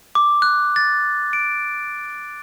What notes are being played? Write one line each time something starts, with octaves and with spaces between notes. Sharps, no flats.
D6
F#6
A6
D7